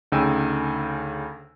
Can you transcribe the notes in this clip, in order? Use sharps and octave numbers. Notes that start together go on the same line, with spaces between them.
D2 C#3 D#4 G5 G#5 E6